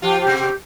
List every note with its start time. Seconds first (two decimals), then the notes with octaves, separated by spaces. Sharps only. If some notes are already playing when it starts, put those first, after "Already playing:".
0.02 F3 F4 G4
0.21 G4
0.27 C3 C4
0.39 G4